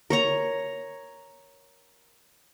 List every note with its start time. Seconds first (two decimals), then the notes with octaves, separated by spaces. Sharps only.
0.10 A#4 C#5 A#5